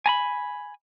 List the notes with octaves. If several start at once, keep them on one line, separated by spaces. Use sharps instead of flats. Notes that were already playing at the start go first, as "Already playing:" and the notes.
G#5 A#5 B5